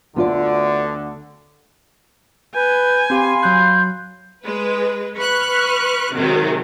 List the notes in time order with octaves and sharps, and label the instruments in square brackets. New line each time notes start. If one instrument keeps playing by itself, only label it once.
[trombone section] D2 D3 [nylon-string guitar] B3 F4 D5
[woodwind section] B4 [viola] G#5 [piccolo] G6
[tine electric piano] C4 G4 [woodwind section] F5 B5 C6
[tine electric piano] F#3 F#6 [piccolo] G6
[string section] G#3 B4
B4 C#6 F6 F#6
C3 D#3 F#3 G#3